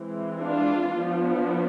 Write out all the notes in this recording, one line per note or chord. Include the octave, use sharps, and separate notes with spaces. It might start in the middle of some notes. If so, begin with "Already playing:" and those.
Already playing: E3 G#3 C4
D4 F4
F3 B3 D4